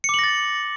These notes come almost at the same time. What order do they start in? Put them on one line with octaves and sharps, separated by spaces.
C#7 D6 F#7 A#6 A6